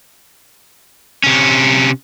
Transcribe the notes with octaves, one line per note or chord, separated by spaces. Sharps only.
C3 C#4